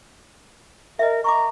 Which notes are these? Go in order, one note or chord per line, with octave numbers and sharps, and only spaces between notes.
A#4 D#5 E5
A#5 C#6 D6